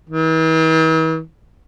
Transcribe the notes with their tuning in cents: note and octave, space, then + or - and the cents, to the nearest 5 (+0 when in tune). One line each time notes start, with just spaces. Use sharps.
E3 -45